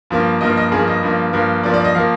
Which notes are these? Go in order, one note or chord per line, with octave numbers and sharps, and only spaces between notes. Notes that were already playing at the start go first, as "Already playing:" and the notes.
G2 F3 A#3
G2 F3 A#3 D#5
D#5
G2 F3 A#3 G#4
D#5
G2 F3 A#3
G2 F3 A#3
G2 F3 A#3 D5
D5
D#5
F3 A#3 F5